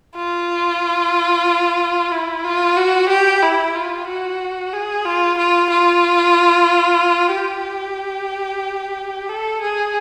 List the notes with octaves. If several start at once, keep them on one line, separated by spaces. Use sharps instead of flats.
F4
E4
F4
F#4
G4
E4
F4
F#4
G#4
F4
F4
F4
G4
A4
G#4